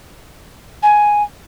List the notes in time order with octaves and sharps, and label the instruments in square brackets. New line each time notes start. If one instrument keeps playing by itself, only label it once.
[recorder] G#5